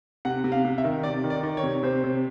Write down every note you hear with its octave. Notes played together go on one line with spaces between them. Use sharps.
C3 F#5
C3
F5
C3
E5
D#3
C3 D5
D#3
D5
D#3
C#5
C3
C3 C5
C3